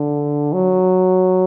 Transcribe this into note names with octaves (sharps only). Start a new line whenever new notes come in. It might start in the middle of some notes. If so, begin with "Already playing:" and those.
Already playing: D3
F#3